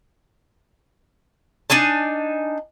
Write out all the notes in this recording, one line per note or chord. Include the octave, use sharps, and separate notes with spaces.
D4 D#4 G#5 A5